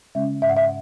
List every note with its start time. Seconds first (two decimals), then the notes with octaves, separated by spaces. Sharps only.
0.15 C#3 G#3 C#4 E5
0.42 G#2 E5
0.49 F#5
0.57 E5